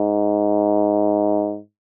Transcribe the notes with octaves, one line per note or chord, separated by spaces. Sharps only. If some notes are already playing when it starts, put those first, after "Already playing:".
Already playing: G#2